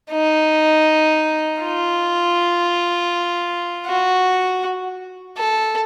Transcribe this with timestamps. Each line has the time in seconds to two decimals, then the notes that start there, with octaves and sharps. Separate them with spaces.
0.11 D#4
1.62 F4
3.87 F#4
5.37 A4